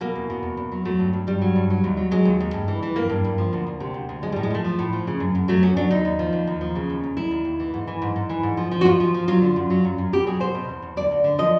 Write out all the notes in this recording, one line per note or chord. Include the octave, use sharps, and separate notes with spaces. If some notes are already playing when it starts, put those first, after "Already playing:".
B2 A#3
E2
B2
E2
E2
F#3
F#3 A3
G2
G2
G2 G3
F#3
G2
F#3
D#2
F#3
F#3 G#3
D#2
D#2
G2
E3
E3
G2 A#3
G2
G2
F3
D2
D2
C3
D2
D2
F3 G#3
A2 G3
G#3
F3 A3
F3
A2
F3
C#3
F#2
F#2
F#3 A3
F#2 C#4
F#3 D4
D#2 D#4
D#2
F3
D#2
D#2
F3
C#3
D#2
D#2
D#2 E4
D#2
D#2
E3
G#2
E3
G#2
G#2
E3
G#2
F3
F3
F#4
G#2 F4
F3
F3
F#3 F4
D3
F#2
F#3
F#2
F#2
B2 G4
F#3 G#4
B2 C5
B2
E2
E2
D2 D5
D2
D3
F3 D#5